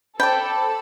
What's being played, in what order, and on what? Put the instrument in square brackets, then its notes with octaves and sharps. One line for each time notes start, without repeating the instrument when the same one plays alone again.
[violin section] A4 [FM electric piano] C5 A5 B5 [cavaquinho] D5 G5